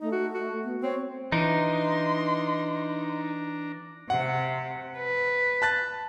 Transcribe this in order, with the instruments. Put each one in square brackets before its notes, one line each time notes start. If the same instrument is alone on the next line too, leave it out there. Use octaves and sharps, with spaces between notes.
[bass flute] A3 [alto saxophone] D#4
[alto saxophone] F#4
F#4
[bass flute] B3
[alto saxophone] C4 [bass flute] C#5
[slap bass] E3 [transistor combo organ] D4 A#5 [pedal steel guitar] D#4 [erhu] C6
[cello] C3 [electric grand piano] F#5
[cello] B4
[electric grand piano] A5 F#6 A6